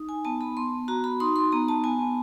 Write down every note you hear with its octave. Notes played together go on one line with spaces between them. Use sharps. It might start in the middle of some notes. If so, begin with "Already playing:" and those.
Already playing: D#4
G#5
B3 A5
B5
B3 C6
F#4 A#5
B5
D#4 C6
C6
B3 A#5
A5
B3 G#5